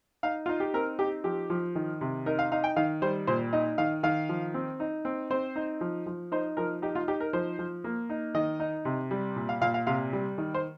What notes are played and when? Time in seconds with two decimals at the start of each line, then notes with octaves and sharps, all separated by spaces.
0.23 D#4 F5
0.46 D#4 F4
0.60 G4
0.74 C4 A#4
0.99 D#4 G4
1.24 F3 G4
1.50 F3
1.75 D#3
2.01 C3
2.26 D#4 A#4
2.39 F5
2.52 D#4 F5
2.64 G5
2.76 D#3 F5
3.02 G3 C5
3.27 A#2 C5
3.53 D#4 D#5
3.78 D#3 F5
4.03 D#3 F5
4.29 F3
4.54 C4
4.80 D#4
5.05 C4
5.30 C4 C5
5.56 D#4
5.81 F3
6.06 F3
6.32 D#4 C5
6.57 F3 A#4
6.82 D#4 G4
6.95 F4
7.08 D#4 G4
7.20 A#4
7.33 F3 C5
7.59 F3
7.84 A#3
8.10 D#4
8.35 D#3 D#5
8.60 D#4
8.85 C3
9.11 G3
9.36 A#2
9.49 F5
9.61 A#2 F5
9.74 F5
9.87 C3 F5
10.13 G3
10.38 D#3
10.54 C5